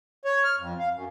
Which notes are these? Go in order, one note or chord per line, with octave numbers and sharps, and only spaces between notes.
C#5
F6
F2
F5
F#2